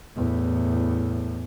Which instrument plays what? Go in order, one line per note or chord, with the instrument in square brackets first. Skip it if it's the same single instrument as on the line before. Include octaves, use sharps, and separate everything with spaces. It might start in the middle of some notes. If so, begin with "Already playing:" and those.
[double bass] E2 A2